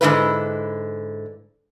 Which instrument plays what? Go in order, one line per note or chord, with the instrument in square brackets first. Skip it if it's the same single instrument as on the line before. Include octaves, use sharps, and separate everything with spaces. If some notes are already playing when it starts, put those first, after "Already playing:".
[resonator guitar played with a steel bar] G#2 B2 D3 E4 B4